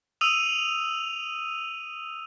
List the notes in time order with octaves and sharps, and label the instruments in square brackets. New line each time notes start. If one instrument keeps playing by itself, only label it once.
[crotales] D#6 E6 D#7 F7